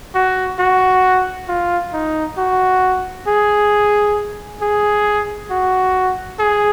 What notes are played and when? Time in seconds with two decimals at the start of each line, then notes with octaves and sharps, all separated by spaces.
0.15 F#4
0.59 F#4
1.48 F4
1.93 D#4
2.38 F#4
3.27 G#4
4.62 G#4
5.51 F#4
6.40 G#4